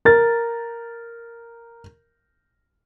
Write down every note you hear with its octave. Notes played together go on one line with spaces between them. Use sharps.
A#4 A6